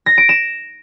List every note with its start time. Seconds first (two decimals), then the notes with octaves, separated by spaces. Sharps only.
0.06 A#6
0.18 D7
0.29 E7